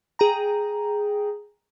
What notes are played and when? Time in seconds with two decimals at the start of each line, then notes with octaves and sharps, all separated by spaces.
0.19 G#4 G5 A#5